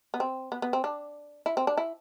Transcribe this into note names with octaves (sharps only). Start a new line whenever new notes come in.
B3
C4
B3
B3
C4
D4
E4
C4
D4
E4